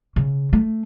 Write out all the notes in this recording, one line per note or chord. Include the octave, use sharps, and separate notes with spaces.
C#3
A3